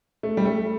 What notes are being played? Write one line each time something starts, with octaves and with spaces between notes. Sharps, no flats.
A3
G3
A3